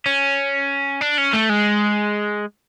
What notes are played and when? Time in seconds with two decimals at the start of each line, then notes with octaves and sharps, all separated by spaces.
0.06 C#4
1.01 D4
1.18 C#4
1.33 A3
1.49 G#3